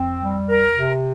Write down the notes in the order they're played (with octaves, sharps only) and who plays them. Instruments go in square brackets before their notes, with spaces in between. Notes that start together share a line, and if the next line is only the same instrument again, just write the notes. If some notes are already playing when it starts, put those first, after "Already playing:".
Already playing: [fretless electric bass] F2 [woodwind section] C4
[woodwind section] G3
A#4
C3